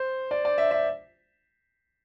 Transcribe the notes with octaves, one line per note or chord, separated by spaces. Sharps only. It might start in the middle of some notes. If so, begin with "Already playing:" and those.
Already playing: C5
D5
D5
E5
E5